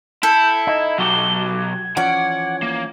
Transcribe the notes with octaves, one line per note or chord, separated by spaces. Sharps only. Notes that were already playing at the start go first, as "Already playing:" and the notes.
E4 A4 G6
D#4 G#6
B1 F#3 F#4 G4 G7
G#6
E3 F3 C#4 D5 F#5
A#3